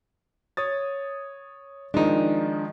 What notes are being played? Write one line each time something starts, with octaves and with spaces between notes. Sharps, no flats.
C#5 D#6 A6
D#3 F3 G#3 D4 D#4